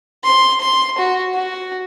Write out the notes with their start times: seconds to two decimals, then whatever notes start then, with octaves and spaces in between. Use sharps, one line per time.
0.24 C6
0.60 C6
0.98 F#4
1.34 F#4